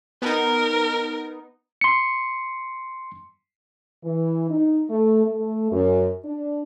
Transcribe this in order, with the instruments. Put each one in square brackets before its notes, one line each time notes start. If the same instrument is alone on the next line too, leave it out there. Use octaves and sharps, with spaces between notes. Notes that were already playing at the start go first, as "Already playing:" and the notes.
[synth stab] B3 D#4 [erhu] A#4
[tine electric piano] C6 C#7
[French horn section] E3
D#4
A3
A3
F#2
D4